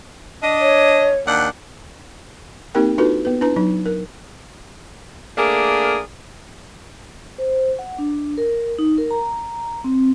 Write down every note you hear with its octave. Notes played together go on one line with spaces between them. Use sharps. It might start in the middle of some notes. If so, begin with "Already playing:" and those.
D4 D#5
C#5
D#2 D4 F#5
A#3 C4 D#4 G4 A#4 G5
D4 D#4 F4 F#4 A4 B4
B3 B4
D4 E4 B4 A#5
F#3 D#4
A#4
A3 A#3 D4 G#4 A#4
C5
F#5
D4
A#4
D#4
A#4
A#5
C4